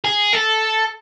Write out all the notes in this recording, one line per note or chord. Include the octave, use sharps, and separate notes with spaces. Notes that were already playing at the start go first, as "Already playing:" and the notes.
G#4
A4